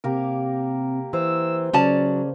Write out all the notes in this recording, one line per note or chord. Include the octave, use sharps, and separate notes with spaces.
C3 A#3 G4 A#4
E3 C5 E6
C#3 F#3 C#4 D5 A5